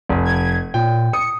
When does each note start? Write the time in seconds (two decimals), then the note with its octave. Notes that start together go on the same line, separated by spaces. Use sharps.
0.09 F1
0.25 G#6
0.74 A#2 G5
1.13 D#6 C#7